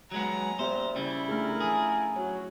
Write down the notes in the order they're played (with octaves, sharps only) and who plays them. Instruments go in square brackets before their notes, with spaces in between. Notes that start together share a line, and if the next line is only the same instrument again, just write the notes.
[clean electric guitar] F#3 G#3 B3 [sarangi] A#5
[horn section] F#2 A#2 E5 [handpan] B3 G4 [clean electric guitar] C5
[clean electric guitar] C#3 G3 [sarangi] E4
[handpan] A3 D4 G#4 [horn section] F4 A#4
[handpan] F3 C#4 [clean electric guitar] G#4
[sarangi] F#3 [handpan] C#5